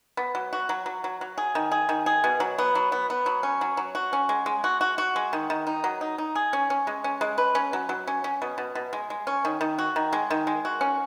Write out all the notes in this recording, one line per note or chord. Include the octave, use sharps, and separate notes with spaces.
B3
F#3
F#4
F#3
F#3
F#3
F#3
G#4
D#3
G#4
D#3
G#4
B2
F#3
B3
F#3
B3
B3
F#3
C#4
F#3
F#3
F#4
C#4
G#3
G#3
F#4
F#4
F#4
G#3
D#3
D#3
D#4
F#3
D#4
D#4
G#4
C#4
C#4
G#3
C#4
G#3
B4
C#4
F#3
F#3
C#4
C#4
B2
B2
B2
G#3
G#3
C#4
D#3
D#3
F#4
D#3
G#3
D#3
G#3
F#4
C#4